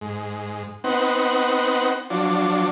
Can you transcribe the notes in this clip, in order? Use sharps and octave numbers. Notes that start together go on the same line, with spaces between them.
G#2
B3 C4 D#4 F#5
F3 F#3 D4